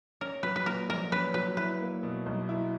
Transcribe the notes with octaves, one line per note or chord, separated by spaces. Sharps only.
C#4 A#4
F#3 B4
B4
A#2 A#4
A#1 A#4
C#4 B4
F#3 B4
E4 B4
A#3
B2
B1
E4